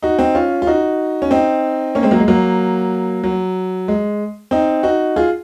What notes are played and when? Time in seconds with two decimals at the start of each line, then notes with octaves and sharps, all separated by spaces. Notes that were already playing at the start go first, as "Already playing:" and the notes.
0.03 D#4 F#4
0.19 C4 D#4
0.35 C#4 F4
0.62 F4
0.67 D#4 F#4
1.22 C#4
1.31 C4 D#4
1.95 A#3 C#4
2.03 G#3 C4
2.11 F#3 A#3
2.20 G#3
2.28 F#3 A#3
3.24 F#3
3.88 G#3
4.51 C4 D#4
4.83 D#4 F#4
5.16 F4 G#4